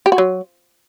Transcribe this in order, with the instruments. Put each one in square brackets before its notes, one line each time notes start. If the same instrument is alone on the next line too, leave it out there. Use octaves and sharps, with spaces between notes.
[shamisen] G4
F#4
F#3